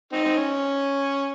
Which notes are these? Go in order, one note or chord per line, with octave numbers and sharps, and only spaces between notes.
C4 D#4
C4
C#4